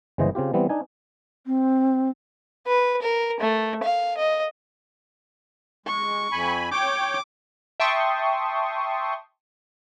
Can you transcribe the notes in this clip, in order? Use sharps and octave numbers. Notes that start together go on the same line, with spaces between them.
G1 C#3 E3 G#3 C5 D#5
C#3 C4 F4 G4
E3 G3 B3 C4
D4 D#4 G#5
C4
B4
A#4
A3
F5
D#5
G#3 C#6
F2 G#5 B5
C#5 G5 D6
E5 G5 A5 C6 C#6 D#6